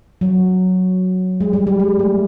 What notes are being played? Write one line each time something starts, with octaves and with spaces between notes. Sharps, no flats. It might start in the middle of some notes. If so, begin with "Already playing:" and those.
F#3
G#3
G3
G3
G#3
A3